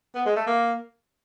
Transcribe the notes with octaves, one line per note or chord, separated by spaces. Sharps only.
B3
G#3
A3
A#3